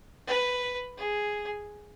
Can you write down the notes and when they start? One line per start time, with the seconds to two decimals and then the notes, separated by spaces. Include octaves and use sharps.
0.27 B4
0.98 G#4